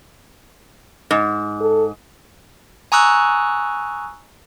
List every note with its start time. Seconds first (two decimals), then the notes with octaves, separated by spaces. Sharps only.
1.11 G#2
1.60 A4
2.92 G#5 A#5 C#6 D#6 E6 F#6